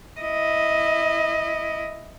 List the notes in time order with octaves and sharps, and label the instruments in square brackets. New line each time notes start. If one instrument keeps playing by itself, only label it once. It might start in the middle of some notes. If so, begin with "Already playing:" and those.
[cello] E4 D#5